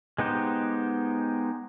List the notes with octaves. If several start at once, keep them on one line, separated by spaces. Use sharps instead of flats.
G#3 B3 D#4 G4 C5